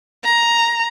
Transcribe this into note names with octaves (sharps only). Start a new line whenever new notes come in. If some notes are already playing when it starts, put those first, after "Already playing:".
A#5